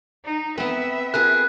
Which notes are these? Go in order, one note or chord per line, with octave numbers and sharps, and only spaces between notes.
D#4
B3 C4 B4 E5
F4 G#4 A#4 F#6